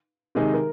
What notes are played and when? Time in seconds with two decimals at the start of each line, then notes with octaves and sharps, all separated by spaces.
0.35 C3 D#3 G#3 D#4 A#4
0.53 A#4